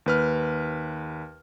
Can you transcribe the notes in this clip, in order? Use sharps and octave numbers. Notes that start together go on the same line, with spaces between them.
D#2 B4 F6